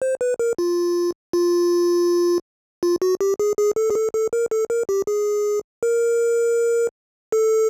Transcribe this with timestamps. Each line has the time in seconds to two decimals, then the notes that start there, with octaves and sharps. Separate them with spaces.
0.02 C5
0.21 B4
0.39 A#4
0.58 F4
1.33 F4
2.83 F4
3.02 F#4
3.21 G4
3.39 G#4
3.58 G#4
3.76 A4
3.90 G#4
3.95 A4
4.14 A4
4.33 A#4
4.51 A4
4.70 A#4
4.89 G4
5.07 G#4
5.83 A#4
7.32 A4